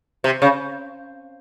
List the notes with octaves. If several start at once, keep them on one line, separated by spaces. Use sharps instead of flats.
C3
C#3